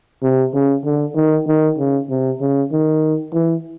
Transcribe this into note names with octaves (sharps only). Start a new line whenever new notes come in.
C3
C#3
D3
D#3
D#3
C#3
C3
C#3
D#3
E3